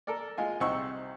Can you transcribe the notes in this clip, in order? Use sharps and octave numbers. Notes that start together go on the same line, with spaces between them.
A4 A#4 D5
G#3 F4 G#5
C2 D#4 C5 F#5 C#6 E6